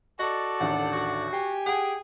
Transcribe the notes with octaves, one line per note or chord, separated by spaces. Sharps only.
F#4 A4 D5 D#5
A1 D#2 D3 F#5
F#4
G4 G#5 C7
G#4 F#5 G5